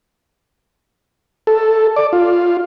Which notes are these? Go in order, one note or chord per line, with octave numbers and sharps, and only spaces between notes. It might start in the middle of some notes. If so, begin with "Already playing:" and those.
A4
D5
F4